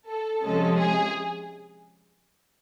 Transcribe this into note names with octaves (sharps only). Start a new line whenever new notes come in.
A4
C3 F3 G#3 C#4 A4
G#4